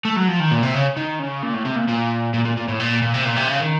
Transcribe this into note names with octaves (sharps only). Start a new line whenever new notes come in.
A3
F#3
F3
D#3
A#2
C3
C#3
D#3
C#3
A#2
A2
C3
A#2
A#2
A#2
A#2
A#2
A2
A#2
A#2
C3
A#2
C3
C#3
D#3